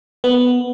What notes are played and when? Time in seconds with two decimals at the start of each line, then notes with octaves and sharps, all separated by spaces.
0.24 B3